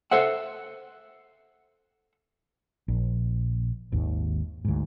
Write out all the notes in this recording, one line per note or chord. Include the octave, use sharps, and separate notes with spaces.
A4 C5 E5 F#5
A#1
G#1 D#2
D2 G#2